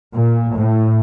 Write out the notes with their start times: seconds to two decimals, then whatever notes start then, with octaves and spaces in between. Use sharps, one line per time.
0.15 A#2
0.56 A2